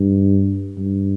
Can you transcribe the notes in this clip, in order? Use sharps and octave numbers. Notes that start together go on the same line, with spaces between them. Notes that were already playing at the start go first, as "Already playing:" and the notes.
Already playing: G2
G2